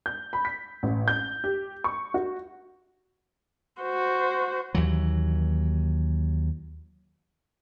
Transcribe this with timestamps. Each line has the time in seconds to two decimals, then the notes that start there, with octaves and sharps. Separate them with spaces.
0.06 G6
0.33 B5
0.45 B6
0.83 A1
1.08 G6
1.44 G4
1.84 C#6
2.14 F#4
3.81 F#4 C5
4.75 D#2 E3 F#3